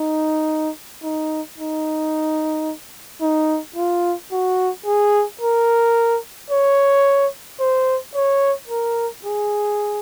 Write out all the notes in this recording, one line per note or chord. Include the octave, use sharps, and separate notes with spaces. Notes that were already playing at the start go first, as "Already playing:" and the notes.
Already playing: D#4
D#4
D#4
D#4
F4
F#4
G#4
A#4
C#5
C5
C#5
A#4
G#4